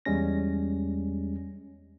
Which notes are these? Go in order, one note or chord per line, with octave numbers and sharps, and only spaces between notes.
E2 G3 G#3 C#4 A#6